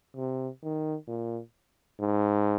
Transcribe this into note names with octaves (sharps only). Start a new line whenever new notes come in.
C3
D#3
A#2
G#2